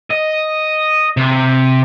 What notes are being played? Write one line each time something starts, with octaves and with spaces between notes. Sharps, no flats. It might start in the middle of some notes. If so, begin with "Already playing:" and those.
D#5
C3